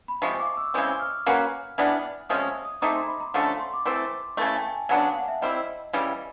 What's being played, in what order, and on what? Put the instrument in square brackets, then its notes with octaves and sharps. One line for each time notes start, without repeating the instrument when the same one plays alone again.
[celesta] B5
[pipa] C3 F3 G#3 [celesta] C#6
[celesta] D6
E6
[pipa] C#3 E3 G#3 C4
[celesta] F6
[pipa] A#3 C#4 F#4 B4
E3 G3 B3 D4
[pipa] C3 F3 G#3 C#4 [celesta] D#6
[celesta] D#6
D#6
[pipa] A3 C4 D#4 G#4 [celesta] D6
[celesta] C6
B5
A#5
[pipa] D3 F3 A3 C#4 [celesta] A#5
[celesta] C6
D6
[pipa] E3 A3 C4
[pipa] C#3 E3 A3 [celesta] A5
[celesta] G#5
G5
G#5
[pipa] C#3 F#3 B3 D4 [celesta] A5
[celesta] F5
F#5
E5
[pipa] G3 C4 E4 [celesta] D#5
[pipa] C#3 E3 G3